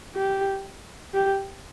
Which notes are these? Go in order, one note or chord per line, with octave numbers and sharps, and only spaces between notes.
G4
G4